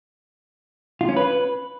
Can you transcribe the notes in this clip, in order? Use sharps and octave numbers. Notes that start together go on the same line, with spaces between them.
F4
C#4
B4